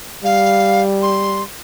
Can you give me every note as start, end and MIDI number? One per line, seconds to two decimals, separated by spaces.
0.24 1.43 55
0.24 0.83 77
1.02 1.42 84